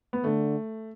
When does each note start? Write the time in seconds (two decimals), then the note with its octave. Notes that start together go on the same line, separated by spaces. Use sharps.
0.13 B3
0.24 D3 A3